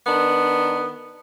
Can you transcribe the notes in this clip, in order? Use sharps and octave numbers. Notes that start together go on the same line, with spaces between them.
D#3 B3 D4